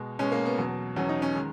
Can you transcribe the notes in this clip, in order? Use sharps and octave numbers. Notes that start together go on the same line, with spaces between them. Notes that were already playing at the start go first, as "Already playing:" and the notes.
Already playing: B2 G#3
B2 G#3 C#4
A#3
B3
E2 B2 F#3
E2 B2 F#3 C#4
D#4
C#4
D#3 G#3